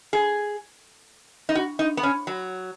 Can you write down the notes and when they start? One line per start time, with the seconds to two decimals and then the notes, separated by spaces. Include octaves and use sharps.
0.13 G#4
1.49 D#4
1.55 F#4
1.79 D#4
1.97 B3
2.03 C#4
2.27 F#3